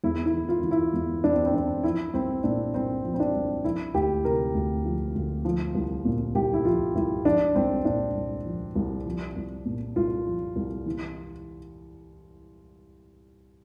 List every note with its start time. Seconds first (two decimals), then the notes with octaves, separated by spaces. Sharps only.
0.04 E2 E4
0.26 E4
0.34 E3
0.49 F4
0.63 E3
0.71 E4
0.94 E2
1.24 E2 D4
1.32 C4
1.46 C4
1.54 E3 D4
1.83 F3 E4
2.14 C2 C4
2.44 A#2 D4
2.74 C2 C4
3.04 F3
3.14 C4
3.20 D4
3.35 C2
3.64 F3 E4
3.94 D2 G4
4.24 C3 A#4
4.55 D2
4.85 F3
5.15 D2
5.45 F3
5.75 C2
6.05 A#2
6.35 C2 G4
6.53 E4
6.65 F3 F4
6.95 C2 E4
7.25 F3 D4
7.55 C2 C4
7.85 A#2 D4
8.15 C2
8.45 F3
8.76 C2
9.06 F3
9.36 C2
9.66 A#2
9.96 C2 F4
10.26 F3
10.56 C2
10.86 E3